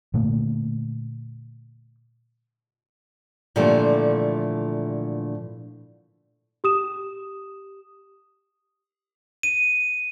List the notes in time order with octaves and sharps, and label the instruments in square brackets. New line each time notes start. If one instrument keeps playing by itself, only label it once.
[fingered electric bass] A#2 D3 A3 A#3
[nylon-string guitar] A#2 D3 E3 F3 G3 A3
[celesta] G4 D#6 E7
[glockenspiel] D#7